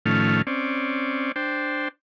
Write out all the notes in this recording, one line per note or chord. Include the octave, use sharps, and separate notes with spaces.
A2 D#3 F3 A3 C#4 F6
C4 C#4 D5
D4 C5 G5